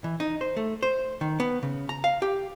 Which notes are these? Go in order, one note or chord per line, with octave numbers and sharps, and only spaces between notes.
E3
D#4
C5
A3
C5
D#3
B3
C#3
A#5
F5
G4